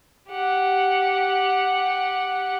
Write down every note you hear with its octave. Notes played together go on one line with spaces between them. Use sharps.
G4 F#5